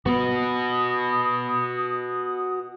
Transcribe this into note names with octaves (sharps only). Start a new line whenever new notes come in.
B3 F#4 B4 D#6